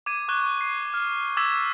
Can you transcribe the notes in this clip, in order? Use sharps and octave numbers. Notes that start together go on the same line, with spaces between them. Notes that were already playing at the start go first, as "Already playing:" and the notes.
D6 G#6 D#7
C#6 D6 F#6 G#6 G7
C7
F6
D6 E6 G#6 A6 B6 E7